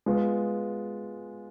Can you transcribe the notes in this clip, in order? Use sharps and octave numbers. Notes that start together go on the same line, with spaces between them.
G#3 B3 F4